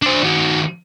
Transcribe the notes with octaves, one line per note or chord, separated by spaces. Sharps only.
D4 C5
D#3 F#4